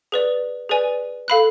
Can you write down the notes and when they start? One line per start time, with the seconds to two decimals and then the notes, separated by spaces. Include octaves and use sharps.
0.12 G#4 B4 D5
0.69 G#4 B4 D5 G#5
1.28 A4 F5 B5 F#6